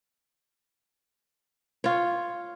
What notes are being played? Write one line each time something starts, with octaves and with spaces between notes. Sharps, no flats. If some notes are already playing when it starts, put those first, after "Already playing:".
F4 C#5